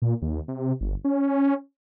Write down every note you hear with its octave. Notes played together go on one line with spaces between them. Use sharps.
A#2
D#2
C3
G1
C#4